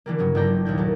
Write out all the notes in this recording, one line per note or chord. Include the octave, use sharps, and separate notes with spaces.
D3 E3 G3 A#3
G2 C#3 F#3
G1 A3 E4 D5 G5 A#5
D#2 A#2 E4 G6
F#3 A3 A#3